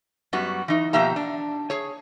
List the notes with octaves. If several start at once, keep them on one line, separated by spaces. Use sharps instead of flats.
F#2 G3 B3 F#4
E3 D#4
B2 F3 A#3 G4 E5 A#5
D4
G#4 C#5